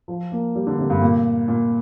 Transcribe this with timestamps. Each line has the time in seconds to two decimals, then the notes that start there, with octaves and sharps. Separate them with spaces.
0.08 F3
0.32 A#3
0.55 G3
0.67 D3
0.79 C3
0.90 G2
1.02 A#2
1.48 A#2